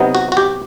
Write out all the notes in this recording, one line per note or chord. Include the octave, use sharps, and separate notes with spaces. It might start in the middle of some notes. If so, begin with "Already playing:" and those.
Already playing: C3 F#3 B3 D#4
F#4
F#4
G4